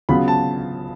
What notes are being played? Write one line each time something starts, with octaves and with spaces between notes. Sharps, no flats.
C#3 F#3 B3 F4 B5
A5